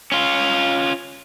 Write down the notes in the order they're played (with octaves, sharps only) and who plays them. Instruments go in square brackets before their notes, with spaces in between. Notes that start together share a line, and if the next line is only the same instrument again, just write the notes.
[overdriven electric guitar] C#4 F4